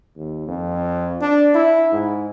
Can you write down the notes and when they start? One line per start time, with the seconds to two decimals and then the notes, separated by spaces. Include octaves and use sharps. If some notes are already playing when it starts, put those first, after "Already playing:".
0.16 D#2
0.47 F2
1.21 D4
1.54 E4
1.92 G#2